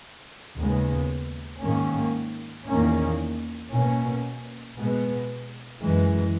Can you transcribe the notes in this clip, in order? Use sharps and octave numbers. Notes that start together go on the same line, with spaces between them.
D#2 C#3 G#3 B3
G#2 D#3 A#3 C#4
E2 D#3 A#3 C#4
B2 A#3 C#4
B2 G#3 B3
F#2 E3 G#3